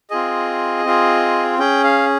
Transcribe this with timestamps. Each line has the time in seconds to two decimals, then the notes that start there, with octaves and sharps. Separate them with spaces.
0.10 C4 F4 G#4 D#5
0.85 C4 F4 G#4
1.59 C#4 G#4 G5
1.84 F5